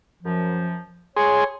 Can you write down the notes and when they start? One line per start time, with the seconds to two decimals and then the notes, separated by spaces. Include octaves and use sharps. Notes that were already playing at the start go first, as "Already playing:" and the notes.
0.23 F#2 F3
1.16 G#4 C#5 C6